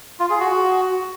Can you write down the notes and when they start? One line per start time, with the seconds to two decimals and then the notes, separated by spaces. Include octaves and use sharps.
0.20 F4
0.30 G#4
0.40 F#4